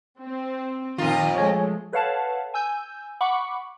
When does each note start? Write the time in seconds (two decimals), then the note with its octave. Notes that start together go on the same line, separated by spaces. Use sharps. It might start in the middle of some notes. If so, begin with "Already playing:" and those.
0.20 C4
0.98 F2 A#2 D#3 F4 A#5 D#6
1.35 F3 G#3 A3 C#5 G#5
1.93 A4 B4 C#5 F5 F#5 A5
2.54 G#5 E6 G6
3.21 F#5 B5 C#6 D6